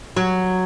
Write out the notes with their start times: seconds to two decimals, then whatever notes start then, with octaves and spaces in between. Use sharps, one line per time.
0.17 F#3